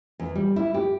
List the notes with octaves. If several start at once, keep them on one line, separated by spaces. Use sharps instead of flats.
E2
G3
E4
G4